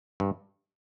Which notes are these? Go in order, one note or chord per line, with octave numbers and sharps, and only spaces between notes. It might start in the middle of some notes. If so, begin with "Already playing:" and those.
G2